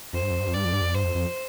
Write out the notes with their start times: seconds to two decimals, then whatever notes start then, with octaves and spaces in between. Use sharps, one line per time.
0.13 F2 C5
0.22 G2
0.31 F2
0.40 G2
0.47 F2
0.54 G2 D5
0.65 F2
0.73 G2
0.81 F2
0.95 G2 C5
1.04 F2
1.15 F2